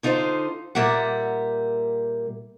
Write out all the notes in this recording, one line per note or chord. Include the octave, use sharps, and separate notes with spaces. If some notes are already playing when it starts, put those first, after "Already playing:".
D3 D#4 F4 A#4 C5
A#2 G3 A#3 E5 F#5